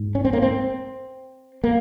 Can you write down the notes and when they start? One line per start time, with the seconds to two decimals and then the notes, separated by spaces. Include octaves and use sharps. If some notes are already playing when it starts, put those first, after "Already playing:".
Already playing: G#2
0.15 C#4
0.25 C4
0.33 A#3
0.42 C4
1.64 A#3